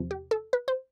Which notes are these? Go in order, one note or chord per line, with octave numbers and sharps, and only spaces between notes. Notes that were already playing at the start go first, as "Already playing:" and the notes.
Already playing: E2 C3 F3
G4
A4
B4
C5